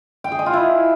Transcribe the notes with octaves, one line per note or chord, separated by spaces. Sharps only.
G5
G#4
D#5
F4
E4